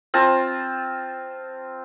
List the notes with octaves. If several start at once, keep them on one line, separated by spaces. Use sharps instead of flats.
C4 F4 A5